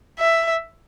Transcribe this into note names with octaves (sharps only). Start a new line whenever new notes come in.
E5